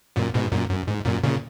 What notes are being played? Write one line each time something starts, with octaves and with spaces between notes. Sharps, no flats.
F#2 A#2
G#2 B2
F#2 A#2
F#2
G#2
F#2 A#2
A#2 C#3